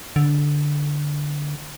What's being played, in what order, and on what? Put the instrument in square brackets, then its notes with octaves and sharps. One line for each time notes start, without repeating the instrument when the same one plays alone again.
[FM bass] D3